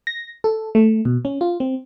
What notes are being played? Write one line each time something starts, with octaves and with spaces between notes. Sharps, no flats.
A#6
A4
A3
B2
C#4
F4
C4